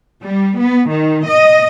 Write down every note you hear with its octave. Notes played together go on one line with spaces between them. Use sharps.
G3
B3
D#3
D#5